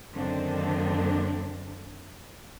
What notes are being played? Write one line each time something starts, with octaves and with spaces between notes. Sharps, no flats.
F#2 D3 D#3 A#3 C4 D4